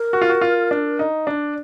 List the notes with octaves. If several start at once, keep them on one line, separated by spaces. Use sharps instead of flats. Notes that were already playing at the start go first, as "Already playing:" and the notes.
Already playing: A#4
F#4
F4
F#4
F4
D4
D#4
D4